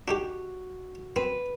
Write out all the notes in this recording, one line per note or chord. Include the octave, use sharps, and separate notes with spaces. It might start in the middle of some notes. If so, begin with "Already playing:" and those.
D4 D#4 F#4 G4
C4 B4